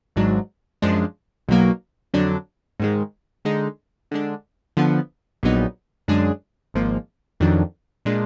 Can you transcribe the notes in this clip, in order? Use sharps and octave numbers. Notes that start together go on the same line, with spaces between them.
G#1 G#2 F#3 D4
F#2 F3 G#3 D4
B1 B2 F#3 A#3
F2 D3 F#3 D4
G#2 D#3 G#3
D3 G#3 D#4
D3 G#3 D4
D3 F3 B3
A#1 A#2 F#3 B3 D#4
F#2 D3 G#3 D4 G#4
G#1 G#2 F3 A#3
F2 D#3 F#3 D4
A#2 G#3 D4